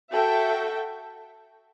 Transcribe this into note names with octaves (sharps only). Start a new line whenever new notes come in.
F#4 A4 E5 G5